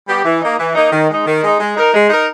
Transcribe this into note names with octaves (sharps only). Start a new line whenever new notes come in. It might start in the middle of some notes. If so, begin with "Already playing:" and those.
G3 B3 G4
E3
A#3 D#4
E3
A#3 D#4
D#3
G#3 D#4
D#3
G#3 D#4
G#3
D#4 A#4
G#3
D#4 A#4